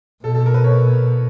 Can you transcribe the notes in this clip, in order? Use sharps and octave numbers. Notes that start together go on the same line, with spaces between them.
B2 A4
A4
A#4
B4
C#5